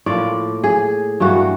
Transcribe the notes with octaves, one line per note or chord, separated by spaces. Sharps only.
A2 F3 A#3 D5
G#4
G2 E3 G3 A#3 F#4